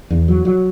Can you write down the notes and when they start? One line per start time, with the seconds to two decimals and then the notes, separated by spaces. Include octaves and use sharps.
0.10 E2
0.28 F#3
0.45 F#3